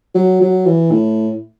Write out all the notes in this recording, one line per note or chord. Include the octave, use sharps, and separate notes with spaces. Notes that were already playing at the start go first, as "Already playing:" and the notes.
F#3
F#3
E3
A2